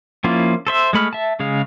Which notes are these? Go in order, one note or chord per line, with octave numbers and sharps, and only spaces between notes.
F3 A#3 C#4 E4 F4
A4 C5 E5
G#3 A3 B5 F6
E5 A5
C#3 G#3 F5